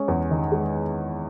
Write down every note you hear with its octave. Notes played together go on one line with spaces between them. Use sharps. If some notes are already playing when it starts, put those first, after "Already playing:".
Already playing: G#3 C#4
E2
D#3
G#3